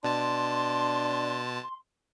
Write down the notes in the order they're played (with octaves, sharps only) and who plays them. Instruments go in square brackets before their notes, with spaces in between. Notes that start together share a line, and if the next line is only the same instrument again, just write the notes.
[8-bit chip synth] B2 A5 [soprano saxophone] D4 [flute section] C6